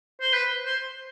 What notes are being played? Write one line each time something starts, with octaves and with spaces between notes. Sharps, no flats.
C5
B4
C5